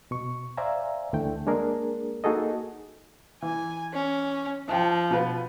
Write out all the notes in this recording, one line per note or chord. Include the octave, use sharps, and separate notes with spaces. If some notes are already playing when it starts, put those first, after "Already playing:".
B2 C#6
C5 D5 E5 F5 G#5 A#5
D2 D3 E3 A3 G5
G#3 A#3 D4 G#4 A#4
A#3 D#4 F#4 G#4 A4 D#5
E3 G#5
C#4
F3 G5 A5
B2 F4 B4